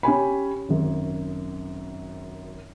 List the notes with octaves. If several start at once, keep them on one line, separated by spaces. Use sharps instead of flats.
C#4 G4 G#5 B5
G#1 F#2